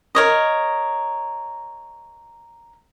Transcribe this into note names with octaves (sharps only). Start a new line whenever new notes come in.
A#4 C#5 D#5